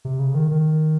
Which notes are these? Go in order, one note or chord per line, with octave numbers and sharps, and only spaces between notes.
C3
C#3
D#3
D#3